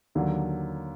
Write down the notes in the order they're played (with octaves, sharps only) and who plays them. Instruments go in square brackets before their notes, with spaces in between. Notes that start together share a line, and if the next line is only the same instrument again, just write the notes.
[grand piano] D#2 D3 F#3